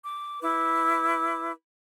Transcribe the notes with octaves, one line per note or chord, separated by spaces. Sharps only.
D6
E4 B4 D6